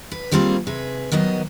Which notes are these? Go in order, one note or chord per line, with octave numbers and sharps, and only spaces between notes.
B4
D#3 G3 A#3 C4 F4 G#4
C3 G#4 B4
D#3 F#3 B3 D#5